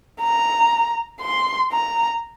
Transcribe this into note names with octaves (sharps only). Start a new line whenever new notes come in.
A#5
C6
A#5